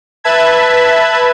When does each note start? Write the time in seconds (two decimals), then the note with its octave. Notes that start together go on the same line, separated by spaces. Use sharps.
0.24 B4 E5 A5 B5 G#6